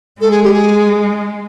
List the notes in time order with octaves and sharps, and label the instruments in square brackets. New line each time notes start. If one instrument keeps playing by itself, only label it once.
[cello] G#3 [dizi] A4
[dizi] G#4
G4
G#4